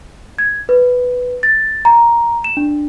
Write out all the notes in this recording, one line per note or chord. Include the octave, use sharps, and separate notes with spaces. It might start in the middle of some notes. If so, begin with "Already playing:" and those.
G#6
B4
A6
A#5
E7
D4